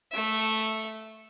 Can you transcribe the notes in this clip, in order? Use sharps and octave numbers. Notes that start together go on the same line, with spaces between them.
A3 E5